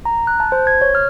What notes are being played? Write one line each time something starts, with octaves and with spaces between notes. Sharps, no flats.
A#5
F#6
A5
C5
G#6
C#5
F6